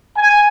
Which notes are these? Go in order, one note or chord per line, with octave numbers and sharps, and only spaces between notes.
G#5